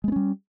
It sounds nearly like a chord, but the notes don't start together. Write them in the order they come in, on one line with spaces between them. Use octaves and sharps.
G#3 B3 C#4 G3